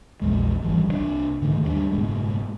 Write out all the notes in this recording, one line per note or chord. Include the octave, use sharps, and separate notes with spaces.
A#1 E2 G#3
G#1 F2 E3 G3
C2 E3 D4
G#2 D3 D#3 A3
D#2 G3 A3 D4
F#1 G#2 B2 G#3